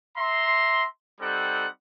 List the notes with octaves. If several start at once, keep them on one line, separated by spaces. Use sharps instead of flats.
E5 A#5 C6
G3 C4 D#4 A4 F#5